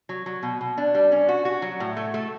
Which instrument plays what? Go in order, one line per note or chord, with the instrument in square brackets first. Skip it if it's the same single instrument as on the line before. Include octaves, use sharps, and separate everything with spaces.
[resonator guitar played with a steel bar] F#3
F#3
B2
B2
D4
G3
C#4
F#4
F#4
F#3
A2
A3
A3